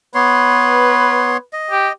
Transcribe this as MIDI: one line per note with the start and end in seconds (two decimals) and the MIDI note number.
0.15 1.37 59
0.15 1.43 71
0.15 1.37 73
0.15 1.37 84
1.53 1.92 75
1.71 1.88 67